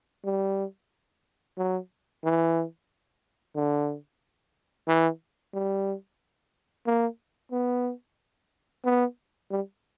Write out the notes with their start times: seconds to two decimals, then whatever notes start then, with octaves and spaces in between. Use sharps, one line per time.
0.25 G3
1.58 F#3
2.24 E3
3.56 D3
4.88 E3
5.54 G3
6.86 A#3
7.52 B3
8.85 B3
9.51 G3